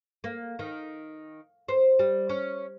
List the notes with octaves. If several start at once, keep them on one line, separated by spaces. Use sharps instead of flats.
A#3
D#3
C5
G3
C#4